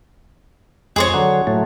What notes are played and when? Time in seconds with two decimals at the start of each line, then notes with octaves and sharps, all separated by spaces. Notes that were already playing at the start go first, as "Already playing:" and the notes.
0.96 F2 G#3 G#4 C5 C#5
1.14 D3 F#3
1.47 A2 F#3 A3